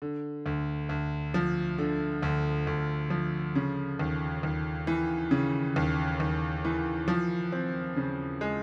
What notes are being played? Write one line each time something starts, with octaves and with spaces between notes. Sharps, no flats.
D3
D2
D2
F3
D3
D2
D2
F3
C#3
D#2
D#2
E3
C#3
D#2
D#2
E3
F3
C4
C#3
G#3